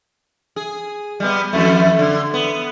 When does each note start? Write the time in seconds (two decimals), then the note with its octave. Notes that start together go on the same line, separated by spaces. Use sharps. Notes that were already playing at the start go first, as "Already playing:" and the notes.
0.56 G#4
1.20 G3 G#3 B3
1.53 F2 E3 A3
1.99 D3
2.34 B3